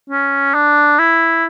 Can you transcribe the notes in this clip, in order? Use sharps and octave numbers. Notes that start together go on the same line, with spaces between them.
C#4
D4
E4